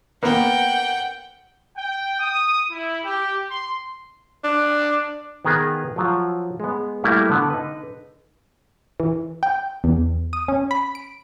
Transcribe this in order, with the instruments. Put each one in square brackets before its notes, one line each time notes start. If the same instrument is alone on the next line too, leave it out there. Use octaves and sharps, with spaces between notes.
[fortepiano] A#3 B3 A#4 [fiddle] F#5 G5
[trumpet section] G5
D#6
E4
G4
C6
[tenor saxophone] D4
[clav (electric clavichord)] D#3 B3 G#4 A#4 B4
F3 F#3 F4
G#3 B3
G3 A3 A#3 E4
D3 B3
D#4 B4
[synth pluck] E3
G5
E2
D#6
C#4
B5
D7